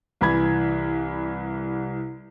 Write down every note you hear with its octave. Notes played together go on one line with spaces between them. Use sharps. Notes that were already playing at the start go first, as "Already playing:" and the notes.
C2 E3 B5 G#6